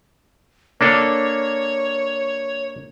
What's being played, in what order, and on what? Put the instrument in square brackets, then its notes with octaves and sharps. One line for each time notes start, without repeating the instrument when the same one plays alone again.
[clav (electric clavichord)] A#3 D4 A4 [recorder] C#5